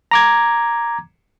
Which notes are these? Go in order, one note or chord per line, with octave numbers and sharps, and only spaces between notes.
A#5 D6 G#6